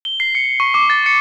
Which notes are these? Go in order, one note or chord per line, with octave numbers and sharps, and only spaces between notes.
G7
C7
C#7
C#6
D6
A6
C#7